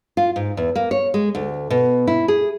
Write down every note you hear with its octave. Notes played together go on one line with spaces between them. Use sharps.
F4
G#2
E2
A#3
C#5
G#3
D2
B2
E4
G#4